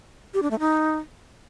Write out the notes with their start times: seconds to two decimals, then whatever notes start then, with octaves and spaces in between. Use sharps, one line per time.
0.34 G4
0.42 D4
0.51 A3
0.59 D#4